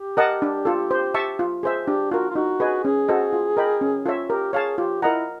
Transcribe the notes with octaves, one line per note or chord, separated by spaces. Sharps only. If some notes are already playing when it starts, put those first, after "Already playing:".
Already playing: G4
A#4 D#5 F#5 A5
D4
F4 A4
C5
E5 A5 C#6
F4
G#4 C5 E5
D4 G4
F4 F#4 A#4
F4
D#4 F#4
G#4 B4 D#5 G#5
C#4 G#4
F#4 A4 C5 D#5
F4
A#4 D#5 G5 B5
C#4
F4 A4 C#5 E5
G4 A#4
G#4 C#5 F5 A5
F4 G4
E4 A#4 D#5 F#5 A#5